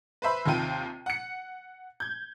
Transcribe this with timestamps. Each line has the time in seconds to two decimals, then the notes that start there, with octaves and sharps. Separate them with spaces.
0.22 B4 C5 E5 B5
0.46 D#2 C3 D#3 F4 G5 D#7
1.06 F#5 C#7
2.00 G6 G#6